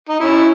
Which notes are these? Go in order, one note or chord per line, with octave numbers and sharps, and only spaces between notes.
D#4
C#4 E4